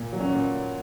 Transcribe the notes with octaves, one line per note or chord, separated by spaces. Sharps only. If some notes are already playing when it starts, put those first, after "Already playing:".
Already playing: A#2
F#3
C#4
A#2